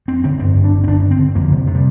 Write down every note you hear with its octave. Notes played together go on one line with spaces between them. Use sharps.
F2 C4
D3 C4
G2 C4
D3
D4
D3
C4
G2 D4
G2
C4
D3
F2 A#3
C3
C3
G3